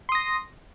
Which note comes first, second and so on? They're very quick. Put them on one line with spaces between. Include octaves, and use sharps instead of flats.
C6 D#6 A#6